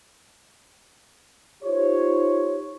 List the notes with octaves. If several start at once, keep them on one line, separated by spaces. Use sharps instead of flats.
D#4 F4 G4 C5 C#5